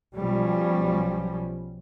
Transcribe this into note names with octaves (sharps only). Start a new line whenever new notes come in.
B1 B2 F3 G3 C#4